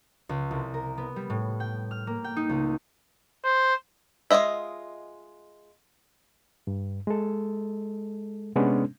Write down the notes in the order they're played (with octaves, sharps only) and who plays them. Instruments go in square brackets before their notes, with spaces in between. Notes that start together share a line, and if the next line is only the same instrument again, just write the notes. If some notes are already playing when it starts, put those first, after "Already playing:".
[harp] C#2
C2
A#4
B3
G3
A2
G5
F6
A#3
G5
D#4
C#2
[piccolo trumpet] C5
[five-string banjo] G#3 C4 F4 D#5 E5
[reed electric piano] G2
G#3 A4
C3 G#3 B3 C#4 D4